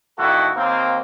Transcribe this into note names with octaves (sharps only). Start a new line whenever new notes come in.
A1 D#3 A#3 E4 F#4 A4
D#2 A#3 C4